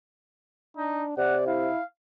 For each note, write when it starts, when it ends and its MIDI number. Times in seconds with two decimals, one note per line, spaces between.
0.77 1.13 62
0.77 1.04 63
1.18 1.68 48
1.18 1.47 74
1.18 1.36 78
1.47 1.81 64
1.47 1.84 77